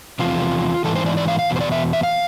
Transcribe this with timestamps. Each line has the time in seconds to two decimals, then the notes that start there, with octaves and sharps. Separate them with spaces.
0.19 E2 C3 F3 F4
0.84 G#2 E3 A4
0.96 C5
1.06 D5
1.17 D5
1.28 F5
1.39 F5
1.50 E2 B2
1.56 C5
1.61 D5
1.72 E5
1.93 E5
2.03 F5